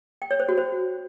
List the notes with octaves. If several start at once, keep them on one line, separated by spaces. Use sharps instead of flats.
G5
C#5
C5
F#4
C5